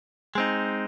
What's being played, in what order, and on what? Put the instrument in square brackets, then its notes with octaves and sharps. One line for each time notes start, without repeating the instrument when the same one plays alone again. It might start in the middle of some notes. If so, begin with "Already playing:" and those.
[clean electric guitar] G#3 C4 D#4